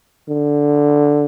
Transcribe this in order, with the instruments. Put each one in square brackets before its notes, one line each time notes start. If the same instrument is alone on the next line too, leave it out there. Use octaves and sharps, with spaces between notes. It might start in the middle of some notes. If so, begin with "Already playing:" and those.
[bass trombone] D3